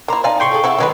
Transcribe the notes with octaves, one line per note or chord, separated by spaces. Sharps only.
A#3 E4 C5 A#5
D#4 D5 F5 G#5 A5
A2 C3 G5 C6 C#6
G#4 A4
C4 E4 A4 E5 F#5
D#3 E3 F#3 G#3 C4 B4